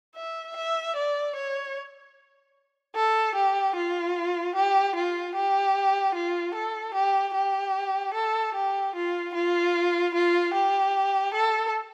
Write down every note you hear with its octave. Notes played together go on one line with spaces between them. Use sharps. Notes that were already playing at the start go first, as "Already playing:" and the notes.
E5
E5
D5
C#5
A4
G4
F4
G4
F4
G4
F4
A4
G4
G4
A4
G4
F4
F4
F4
G4
A4